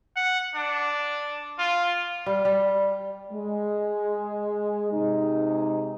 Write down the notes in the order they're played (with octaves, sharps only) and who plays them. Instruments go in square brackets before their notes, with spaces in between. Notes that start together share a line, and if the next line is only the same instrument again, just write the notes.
[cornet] F#5
D4
F4
[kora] G3
G3
[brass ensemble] G#3
C3 G#3 D#4